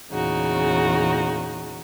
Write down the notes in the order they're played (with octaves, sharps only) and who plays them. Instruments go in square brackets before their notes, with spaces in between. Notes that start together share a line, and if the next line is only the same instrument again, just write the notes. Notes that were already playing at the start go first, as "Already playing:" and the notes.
[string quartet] E2 A#2 C#3 D#4 F#4